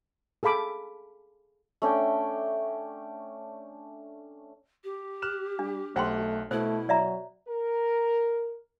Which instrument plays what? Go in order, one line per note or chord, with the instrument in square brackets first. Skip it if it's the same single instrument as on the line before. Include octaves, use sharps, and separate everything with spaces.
[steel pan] G#4 A4 F5 B5 D6
[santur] A3 C#4 D4 G5
[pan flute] G4
[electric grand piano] F6 F#6 E7
[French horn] G3 [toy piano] D4
[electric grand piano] B1 F#5 F#6 [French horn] A3 [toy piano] C5 G5 C6
[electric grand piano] B2 [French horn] A3 [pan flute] E4 [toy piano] C5
[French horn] F#3 [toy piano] D5 E5 A#5
[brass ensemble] A#4